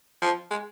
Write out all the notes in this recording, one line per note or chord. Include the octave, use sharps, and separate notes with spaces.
F3
G#3